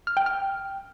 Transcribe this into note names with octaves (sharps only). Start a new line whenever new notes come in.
F6
G5
F6